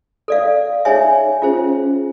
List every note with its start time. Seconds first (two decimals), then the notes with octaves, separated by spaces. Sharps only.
0.28 A4 D5 F5
0.85 D#4 G#4 C#5 E5 G#5
1.42 C#4 F4 G#4 C5